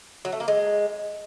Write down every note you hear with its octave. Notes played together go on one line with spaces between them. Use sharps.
F#3
A3
A#3
G#3